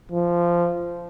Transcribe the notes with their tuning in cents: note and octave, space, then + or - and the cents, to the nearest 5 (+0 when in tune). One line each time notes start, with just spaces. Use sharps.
F3 -15